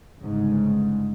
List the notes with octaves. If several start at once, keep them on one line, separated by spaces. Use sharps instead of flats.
G1 G#2 C#3